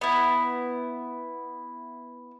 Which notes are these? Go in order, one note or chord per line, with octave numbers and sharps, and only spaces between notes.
B3 E4